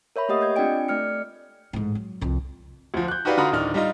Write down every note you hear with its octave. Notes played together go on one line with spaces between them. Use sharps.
A#4 C#5 E5 B5
A3 A#3 G4 D#5 F#5 D#6
D#5 G6 G#6
C4 D4 F4 D5 G5 D7
A3 D5 F6 C#7
A1 G#2
F#3
C2 F2
D2 F3
F#6 G6
D#4 F#4 G4 B4 D5 F5
D3 F4 F#4 A#5 B5 D#6
D1 D#3 D4 D#4 F6
G3 D#4 F4 D#5